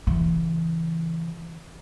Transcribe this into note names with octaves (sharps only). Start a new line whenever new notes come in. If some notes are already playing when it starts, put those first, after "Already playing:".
C#3 E3